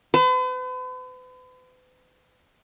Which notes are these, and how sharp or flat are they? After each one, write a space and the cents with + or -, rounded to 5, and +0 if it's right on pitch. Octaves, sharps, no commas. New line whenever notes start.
B4 +45